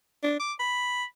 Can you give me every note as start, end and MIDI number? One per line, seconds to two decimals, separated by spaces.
0.23 0.37 62
0.40 0.53 86
0.60 1.04 83